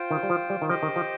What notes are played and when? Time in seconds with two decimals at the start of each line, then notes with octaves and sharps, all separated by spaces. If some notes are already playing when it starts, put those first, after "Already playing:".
Already playing: F4 C5 G5
0.11 D#3
0.23 G3
0.30 F3
0.50 G3
0.62 D#3
0.69 F3 G4 C5 D#5 G5
0.83 D#3
0.96 F3